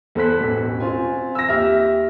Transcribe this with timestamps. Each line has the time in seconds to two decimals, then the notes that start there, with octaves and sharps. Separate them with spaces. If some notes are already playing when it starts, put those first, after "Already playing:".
0.15 E2 A4 C5 F#6 B6
0.40 E1 A1
0.80 C4 F4 G#5
1.35 E6 A#6
1.48 D#2 G4 E5 F6